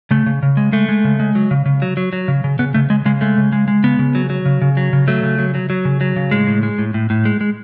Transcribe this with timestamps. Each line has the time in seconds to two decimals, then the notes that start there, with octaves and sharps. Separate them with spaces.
0.11 C#3 A3
0.26 C#3
0.43 C#3
0.57 G#3
0.72 G#3 A3
0.89 G#3
1.04 C#3
1.20 G#3
1.35 F#3
1.51 C#3
1.66 C#3
1.82 F#3
1.97 F#3
2.13 F#3
2.28 C#3
2.44 C#3
2.59 C#3 B3
2.74 C#3 A3
2.90 C#3 G#3
3.05 C#3 G#3
3.21 G#3 A3
3.38 C#3
3.52 G#3
3.68 G#3
3.83 C#3 B3
3.99 C#3
4.15 F#3
4.30 F#3
4.45 C#3
4.62 C#3
4.77 F#3
4.93 C#3
5.08 F#3 A3
5.23 C#3
5.39 F#3
5.55 F#3
5.70 F#3
5.85 C#3
6.01 F#3
6.16 C#3
6.31 A2 G#3
6.47 A2
6.63 G#3
6.78 A2
6.94 A2
7.10 A2
7.25 G#3
7.41 G#3